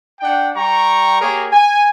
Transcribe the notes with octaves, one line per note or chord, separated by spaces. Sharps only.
D4 F#5 G5
G3 G5 A#5 C#6
A#3 G4 G#4 A#4 C#5
G#5